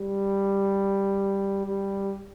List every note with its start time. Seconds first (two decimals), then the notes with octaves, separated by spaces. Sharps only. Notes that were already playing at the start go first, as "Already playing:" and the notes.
Already playing: G3
1.65 G3